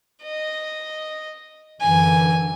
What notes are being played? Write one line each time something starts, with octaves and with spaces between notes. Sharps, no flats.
D#5
F#2 D3 E3 G#5